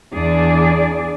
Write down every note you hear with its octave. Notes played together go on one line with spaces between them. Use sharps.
E2 D4 G#4 D5